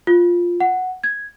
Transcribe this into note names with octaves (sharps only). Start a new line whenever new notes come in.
F4
F#5
G#6